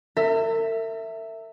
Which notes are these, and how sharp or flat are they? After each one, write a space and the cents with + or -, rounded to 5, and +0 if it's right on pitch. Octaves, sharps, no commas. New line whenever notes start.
A#4 -45 E5 +0